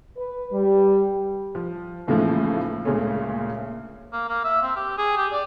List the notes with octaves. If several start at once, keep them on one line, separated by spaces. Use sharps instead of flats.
B4
G3
F3
D#2 A2 C#3 E3 F3 A3
D2 A#2 C#3 G#3 A3 C#4
A#3
A#3
E5
C4
G4
G#4
G4
D5